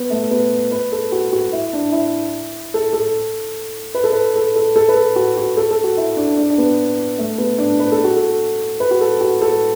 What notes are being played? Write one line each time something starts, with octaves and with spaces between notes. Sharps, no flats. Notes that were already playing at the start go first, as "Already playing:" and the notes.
Already playing: B3
A3
B3
B4
A4
F#4
F#4
E4
D4
E4
A4
A4
B4
A4
B4
A4
A4
A4
B4
A4
F#4
F#4
A4
A4
F#4
E4
D4
D4
D4
B3
A3
B3
D4
B4
A4
F#4
A4
B4
F#4
A4
F#4
A4